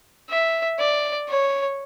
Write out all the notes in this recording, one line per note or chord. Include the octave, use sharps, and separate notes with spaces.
E5
D5
C#5